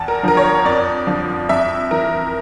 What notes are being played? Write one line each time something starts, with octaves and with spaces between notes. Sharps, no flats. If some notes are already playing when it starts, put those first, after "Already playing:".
Already playing: E2 A5
A#4
D3 F3 A#4
C#5
F2 D5
D3 F3
F2 E5
E3 A#4